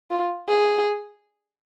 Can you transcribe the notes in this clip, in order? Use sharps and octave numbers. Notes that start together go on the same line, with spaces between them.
F4
G#4